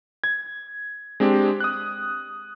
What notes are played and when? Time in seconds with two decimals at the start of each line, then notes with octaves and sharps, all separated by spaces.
0.24 G#6
1.20 G#3 C4 D4 G4
1.60 D#6 F#6